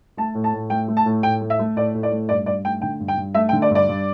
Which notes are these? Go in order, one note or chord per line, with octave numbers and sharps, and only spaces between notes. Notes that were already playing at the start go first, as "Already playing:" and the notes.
A3 A5
A2
A5
A2
A3 G5
A3
A5
A2
A2 G5
A3
E5
A3
A2 D5
A2
D5
A3
G2 D5
G2 D5
A3 G5
D3 G5
G2
G5
G2
A3 E5
G5
D3
D5
G2
D5
G2